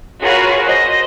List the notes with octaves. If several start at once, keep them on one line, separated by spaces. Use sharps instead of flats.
F4 F#4 G#4 A#4 B4 C#5
C5 D#5